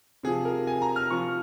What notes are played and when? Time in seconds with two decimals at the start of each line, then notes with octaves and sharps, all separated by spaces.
0.23 C3 F3 G#4
0.45 A#4
0.67 G#5
0.82 A#5
0.96 F6
1.10 C3 F3 C#6